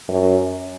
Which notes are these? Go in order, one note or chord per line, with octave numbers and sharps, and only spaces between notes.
F#2